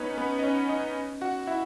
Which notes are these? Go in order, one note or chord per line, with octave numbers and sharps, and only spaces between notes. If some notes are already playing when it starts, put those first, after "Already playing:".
Already playing: B3 C#4 D#4 B4 C#5 D#5
B3 B4
D#5
C#4 C#5
D#4 D#5
F#4 F#5
E4 E5